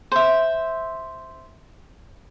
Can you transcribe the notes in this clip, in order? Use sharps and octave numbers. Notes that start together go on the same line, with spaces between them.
C5 E5